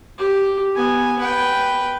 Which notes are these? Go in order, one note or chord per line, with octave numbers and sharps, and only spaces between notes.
G4
B3 G#5
B4 G5